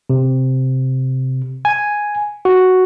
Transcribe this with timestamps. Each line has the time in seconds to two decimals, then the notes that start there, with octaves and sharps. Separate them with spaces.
0.10 C3
1.65 G#5
2.45 F#4